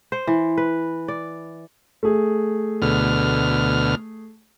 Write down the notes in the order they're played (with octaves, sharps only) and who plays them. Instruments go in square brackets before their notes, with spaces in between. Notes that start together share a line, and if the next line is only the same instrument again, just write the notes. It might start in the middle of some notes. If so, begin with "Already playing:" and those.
[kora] C5
E3
B4
D5
[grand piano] A3 G#4
[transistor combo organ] D2 B2 F6